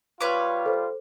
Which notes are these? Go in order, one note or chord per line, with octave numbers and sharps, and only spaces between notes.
G3 F4 B4 C#5 D6
A4 C5